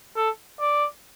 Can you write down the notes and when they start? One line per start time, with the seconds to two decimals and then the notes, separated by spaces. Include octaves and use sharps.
0.16 A4
0.60 D5